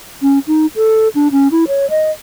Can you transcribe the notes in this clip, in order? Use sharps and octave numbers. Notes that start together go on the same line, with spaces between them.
C#4
D#4
A4
D4
C#4
E4
C#5
D#5